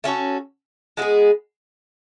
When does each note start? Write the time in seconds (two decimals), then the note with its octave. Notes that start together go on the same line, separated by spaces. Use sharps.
0.04 A3 C#4 F#4 A4
0.97 G#3 B3 E4
1.02 G#4